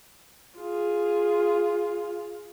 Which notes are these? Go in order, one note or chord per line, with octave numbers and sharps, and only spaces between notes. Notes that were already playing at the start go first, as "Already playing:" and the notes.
F4 G#4